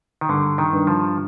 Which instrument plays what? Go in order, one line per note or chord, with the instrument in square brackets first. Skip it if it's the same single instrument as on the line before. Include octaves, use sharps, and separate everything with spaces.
[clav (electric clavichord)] D#3
[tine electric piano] G2 [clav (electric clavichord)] D3
[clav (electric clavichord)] D#3
[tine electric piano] G2
[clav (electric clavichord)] F3